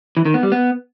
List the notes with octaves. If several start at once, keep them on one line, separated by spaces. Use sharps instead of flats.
E3
D#3
B3
G3
B3